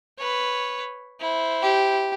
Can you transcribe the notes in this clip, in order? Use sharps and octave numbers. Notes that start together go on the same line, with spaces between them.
B4 C#5
E4 C5
G4